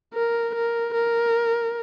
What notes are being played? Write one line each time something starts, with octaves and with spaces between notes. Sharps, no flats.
A#4
A#4
A#4